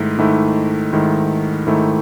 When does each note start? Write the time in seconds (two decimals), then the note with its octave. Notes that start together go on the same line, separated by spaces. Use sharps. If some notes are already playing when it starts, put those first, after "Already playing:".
Already playing: G#2 D#3 A3 E4
0.18 G#2 D#3 A3 E4
0.93 G#2 D#3 A3 E4
1.67 G#2 D#3 A3 E4